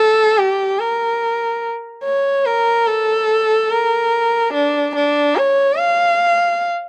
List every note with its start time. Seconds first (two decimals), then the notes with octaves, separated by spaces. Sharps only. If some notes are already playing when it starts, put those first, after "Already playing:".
Already playing: A4
0.37 G4
0.79 A#4
2.04 C#5
2.46 A#4
2.87 A4
3.70 A#4
4.54 D4
4.95 D4
5.37 C#5
5.79 F5